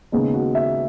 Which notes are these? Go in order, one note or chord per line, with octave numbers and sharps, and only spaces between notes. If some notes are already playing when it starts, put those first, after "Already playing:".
D#2 C#3 G#3 B3 D#4
F#4
E5